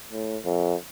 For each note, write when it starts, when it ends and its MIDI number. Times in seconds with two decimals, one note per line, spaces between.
0.12 0.37 45
0.45 0.75 41